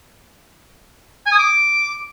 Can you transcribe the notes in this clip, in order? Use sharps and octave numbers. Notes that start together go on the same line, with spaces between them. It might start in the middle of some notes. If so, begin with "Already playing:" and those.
G#5
D#6
D6